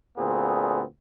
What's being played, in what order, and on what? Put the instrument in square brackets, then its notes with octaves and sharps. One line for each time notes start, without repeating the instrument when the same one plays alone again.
[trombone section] D2 A#2 B3 C4 G#4